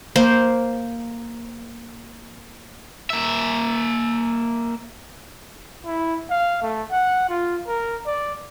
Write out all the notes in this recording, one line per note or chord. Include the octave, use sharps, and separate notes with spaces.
A#3 C5
A#3 E5
E4
F5
A3
F#5
F4
A#4
D5